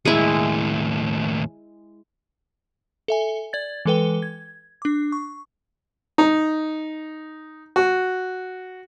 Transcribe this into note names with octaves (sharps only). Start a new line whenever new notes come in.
D#2 A2 G#3 E4
A4 E5 G#5
D5 G#6 A6
E3 G#3 A4 B4 G5 G7
G#6
D4 D6
C#6
D#4
F#4